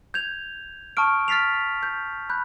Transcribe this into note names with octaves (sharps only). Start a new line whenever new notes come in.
G6 G#6 F7
A5 C#6 D#6 F6 D7
F6 A6 B6 C7 F7
G6
B5 F#6 G6